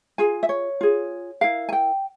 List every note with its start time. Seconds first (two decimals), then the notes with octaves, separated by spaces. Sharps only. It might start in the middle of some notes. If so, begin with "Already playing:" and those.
0.18 F4 G#4 G#5
0.43 E5
0.49 C#5
0.81 F4 G#4
1.41 E4 A#4 F5
1.69 G#5
1.73 G5